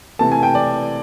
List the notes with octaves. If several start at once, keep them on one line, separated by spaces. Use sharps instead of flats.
C3 E3 A3 A5
G#5
G5
D5